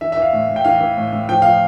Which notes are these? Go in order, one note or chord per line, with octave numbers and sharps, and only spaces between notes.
E3 E5
E5
E3 F5
A2
A2
G5
E3 F5
E3
A2
A2
F3 G5
F3 F5